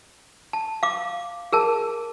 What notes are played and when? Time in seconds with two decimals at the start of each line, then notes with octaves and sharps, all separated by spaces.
0.53 A5
0.83 F5 D6
1.53 G#4 A#4 A5